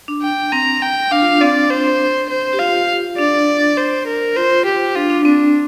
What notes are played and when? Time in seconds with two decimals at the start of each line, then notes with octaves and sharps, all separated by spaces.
0.08 D4
0.22 G5
0.52 C4 A#5
0.82 G5
1.11 D4 F5
1.21 F4
1.31 D4
1.41 C4 D5
1.70 C5
2.30 C5
2.53 G4
2.59 F4 F5
3.18 D4 D5
3.77 C5
4.07 A#4
4.36 F4 C5
4.65 G4
4.95 D4 F4
5.10 D4
5.25 C4 D4